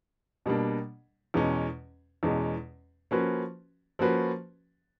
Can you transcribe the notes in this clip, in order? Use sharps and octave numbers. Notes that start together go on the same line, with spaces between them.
B2 G3 A#3 D4
E2 B2 G#3 C#4
E2 B2 G#3 C#4
F3 A#3 C#4 F#4 B4
F3 A#3 C#4 F#4 B4